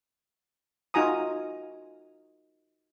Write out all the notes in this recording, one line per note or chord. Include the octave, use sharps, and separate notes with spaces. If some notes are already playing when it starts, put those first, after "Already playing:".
D#4 F4 F#4 G#5 A#5 D#6